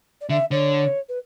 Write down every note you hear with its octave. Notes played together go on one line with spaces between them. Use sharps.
D5
D3 E5
D3 C#5
B4